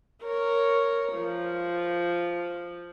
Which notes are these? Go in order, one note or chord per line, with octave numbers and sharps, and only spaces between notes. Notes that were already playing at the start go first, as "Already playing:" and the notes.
A#4 C#5
F3